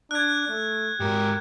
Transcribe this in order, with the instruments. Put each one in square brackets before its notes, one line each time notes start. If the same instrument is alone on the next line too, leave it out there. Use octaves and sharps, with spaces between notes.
[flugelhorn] D4 [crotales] F#6 G#6
[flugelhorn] A3
[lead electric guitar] G#2 A#4 [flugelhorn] G4